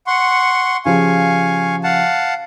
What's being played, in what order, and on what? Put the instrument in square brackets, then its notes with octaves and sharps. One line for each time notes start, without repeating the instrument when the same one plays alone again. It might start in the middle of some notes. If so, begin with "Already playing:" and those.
[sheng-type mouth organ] F#5 C6 C#6
[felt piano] C#3 F3 G4 [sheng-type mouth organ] F5 G#5 C#6
[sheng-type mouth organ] F5 F#5 A5